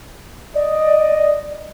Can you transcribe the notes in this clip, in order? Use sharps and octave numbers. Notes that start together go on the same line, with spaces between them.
D5 D#5